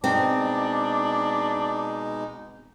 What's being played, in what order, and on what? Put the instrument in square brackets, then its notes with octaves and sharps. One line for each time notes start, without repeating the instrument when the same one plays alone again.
[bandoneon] B2 G#3 D#4 [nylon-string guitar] C4 [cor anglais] D4